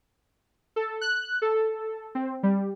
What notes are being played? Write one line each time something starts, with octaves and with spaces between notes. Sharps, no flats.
A4
F#6
A4
C4
G3